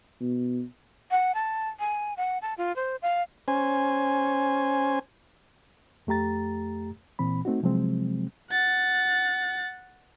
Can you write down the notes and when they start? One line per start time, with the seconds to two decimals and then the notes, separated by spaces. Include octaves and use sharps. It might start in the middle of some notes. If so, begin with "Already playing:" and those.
0.20 B2
1.11 F#5
1.35 A5
1.79 G#5
2.17 F#5
2.42 A5
2.58 F4
2.76 C5
3.02 F5
3.48 C#4 C5 G#5
6.07 F2 A3 G4 A#5 A6
7.19 A#2 E3 C4 B5
7.45 A3 C4 D#4 F#4
7.63 C3 F3 F#3 G#3 C4
8.50 F#5 A6